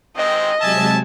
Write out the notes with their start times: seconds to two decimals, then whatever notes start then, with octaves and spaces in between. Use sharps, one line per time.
0.16 D#3 G#3 C4 D#5
0.61 C3 F#3 G#3 E5 G#5 A5